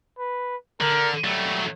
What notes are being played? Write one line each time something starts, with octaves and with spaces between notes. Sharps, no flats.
B4
D3 A#4
F#3 G3 A3